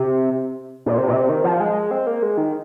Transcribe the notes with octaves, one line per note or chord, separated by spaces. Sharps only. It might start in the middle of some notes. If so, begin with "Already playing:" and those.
Already playing: C3
A#2
C3
A#2
C3
D#3
F3
G#3
C4
A#3
G#3
D#3